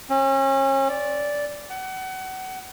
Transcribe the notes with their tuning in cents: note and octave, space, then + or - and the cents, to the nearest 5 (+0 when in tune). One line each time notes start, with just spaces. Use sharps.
C#4 -35
D5 -10
F#5 +30